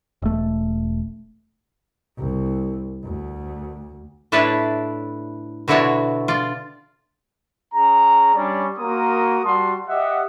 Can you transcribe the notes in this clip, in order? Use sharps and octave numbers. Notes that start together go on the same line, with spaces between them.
E1 A3
C2
D2
A2 D4 E4 B4 C#5 A5
B2 D3 E4 F#4 C#5 D5
F4 D5
C#4 G#4 A#5
G3 C#4 D4 C#5 D5
A#3 F#4 A#4 C6 D#6
G3 F#4 A5 C6
G4 D#5 E5 F#5